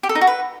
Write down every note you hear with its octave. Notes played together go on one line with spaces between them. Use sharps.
G4
A4
D#4
F#4
B4